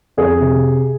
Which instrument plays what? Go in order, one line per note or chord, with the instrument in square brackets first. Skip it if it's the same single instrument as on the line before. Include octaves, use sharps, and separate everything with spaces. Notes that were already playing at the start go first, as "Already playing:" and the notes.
[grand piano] F2 G#4
C3